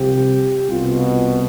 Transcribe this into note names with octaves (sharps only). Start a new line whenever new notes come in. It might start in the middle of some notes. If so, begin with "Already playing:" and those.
Already playing: C2 C3 F3 G4
C2 B2 F4